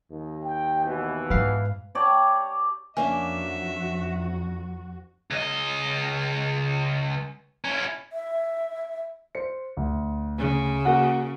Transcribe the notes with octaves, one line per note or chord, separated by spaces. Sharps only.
D#2
G5
B2 E3
G#2 B4 F5
G4 C#5 D5 A5
F2 A#3 C#4 D4 F#4 E5 G#5
C#2 D#5
C#4 E4
E5
C5 C#7
D2
C#3
A#3 F#4 F#5